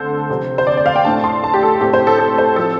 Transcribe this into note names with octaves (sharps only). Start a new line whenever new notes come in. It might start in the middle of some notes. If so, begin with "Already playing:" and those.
Already playing: D3 A3 C4 A4 C5
C3 F3 C4
C5
D5
D5
F5
G5
A2 A3 D4 A5
C6
A5
G4
A4
A2 A3 C4 G4
C5
A4
A4
C5
F3 C4 A4